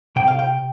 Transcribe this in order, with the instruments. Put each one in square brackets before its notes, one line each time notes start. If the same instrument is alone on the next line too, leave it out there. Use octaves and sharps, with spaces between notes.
[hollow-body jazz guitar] C3 G5
F5
G5